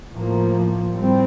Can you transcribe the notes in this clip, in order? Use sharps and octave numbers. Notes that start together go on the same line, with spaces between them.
A2 F3 A#3
A2 G3 C4